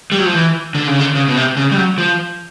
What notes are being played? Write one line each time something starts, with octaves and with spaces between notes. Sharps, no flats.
G3
F#3
F3
E3
D3
C#3
D3
C#3
B2
C3
C#3
G3
F#3
F3